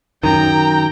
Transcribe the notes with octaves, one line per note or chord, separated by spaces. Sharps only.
F#2 D#3 G5 A#5